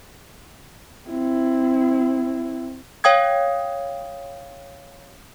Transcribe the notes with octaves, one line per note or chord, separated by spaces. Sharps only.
C4 E4
C#5 F5 G5 D#6 G#6